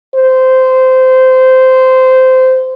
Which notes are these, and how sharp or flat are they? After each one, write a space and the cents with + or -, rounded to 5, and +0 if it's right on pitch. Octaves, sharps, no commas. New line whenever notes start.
C5 -15